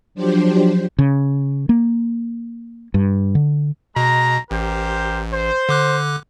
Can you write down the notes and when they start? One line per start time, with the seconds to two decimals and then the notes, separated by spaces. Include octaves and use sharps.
0.15 F3 F#3 D4 G4 C5
0.99 C#3
1.69 A#3
2.94 G2
3.35 D3
3.96 B2 G#3 A#5
4.51 A1 G4 A#4 C5
5.33 C5
5.69 D3 D6 F#6